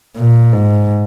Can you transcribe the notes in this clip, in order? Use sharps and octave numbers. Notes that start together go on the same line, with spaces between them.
A#2
G#2